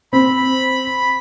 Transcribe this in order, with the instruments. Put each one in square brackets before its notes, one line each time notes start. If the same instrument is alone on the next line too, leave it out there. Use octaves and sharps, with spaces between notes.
[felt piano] C4 [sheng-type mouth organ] B5